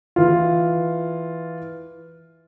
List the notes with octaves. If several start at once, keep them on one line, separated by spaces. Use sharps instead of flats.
E3 F4